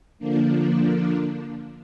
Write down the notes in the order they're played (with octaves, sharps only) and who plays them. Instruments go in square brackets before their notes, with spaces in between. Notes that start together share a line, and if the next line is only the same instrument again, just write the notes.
[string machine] D3 F3 A#3 D4